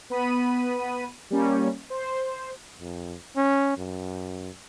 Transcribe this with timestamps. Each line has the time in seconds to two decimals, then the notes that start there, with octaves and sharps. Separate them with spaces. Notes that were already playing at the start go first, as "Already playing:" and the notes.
0.10 B3 B5 D#7
1.30 G3 A#3 C#4
1.90 C5
2.80 F2
3.36 C#4
3.78 F#2